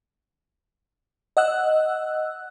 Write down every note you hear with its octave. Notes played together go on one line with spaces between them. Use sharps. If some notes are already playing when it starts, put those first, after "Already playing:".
D#5 F#5 E6 F#6